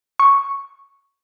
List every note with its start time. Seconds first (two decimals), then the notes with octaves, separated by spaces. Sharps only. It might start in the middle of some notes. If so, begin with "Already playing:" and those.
0.20 C#6